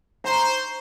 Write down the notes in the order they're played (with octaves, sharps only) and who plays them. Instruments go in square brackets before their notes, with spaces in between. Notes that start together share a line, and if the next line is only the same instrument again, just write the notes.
[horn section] C5 [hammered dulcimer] A#5 C#6